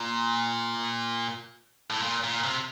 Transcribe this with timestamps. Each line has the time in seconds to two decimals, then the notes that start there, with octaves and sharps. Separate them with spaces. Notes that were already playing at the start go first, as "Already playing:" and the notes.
Already playing: A#2
1.90 A2
2.02 A#2
2.24 A#2
2.44 C3